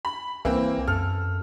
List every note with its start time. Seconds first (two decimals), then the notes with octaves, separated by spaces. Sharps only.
0.05 B5
0.45 C2 E3 A#3 C4
0.88 F#2 A4 F6